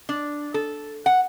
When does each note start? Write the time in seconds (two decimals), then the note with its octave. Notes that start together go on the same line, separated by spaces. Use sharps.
0.09 D4
0.54 A4
1.06 F#5